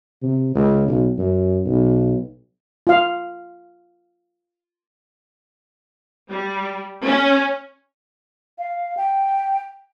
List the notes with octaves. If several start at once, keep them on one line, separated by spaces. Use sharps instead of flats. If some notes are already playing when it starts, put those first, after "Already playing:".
C3
C#2
B1
F#2
B1
F4 F5
G3
C#4
F5
G5